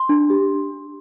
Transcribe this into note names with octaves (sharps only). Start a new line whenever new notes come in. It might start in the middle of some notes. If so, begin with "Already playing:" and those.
Already playing: C6
D4
G4